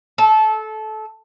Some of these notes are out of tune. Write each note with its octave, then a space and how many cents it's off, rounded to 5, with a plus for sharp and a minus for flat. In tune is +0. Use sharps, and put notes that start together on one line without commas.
A4 -20